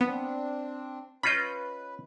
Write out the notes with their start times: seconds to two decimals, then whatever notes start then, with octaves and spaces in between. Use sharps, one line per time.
0.01 B3 C4 D4
1.23 C#4 F4 B4 D#5 B5 G6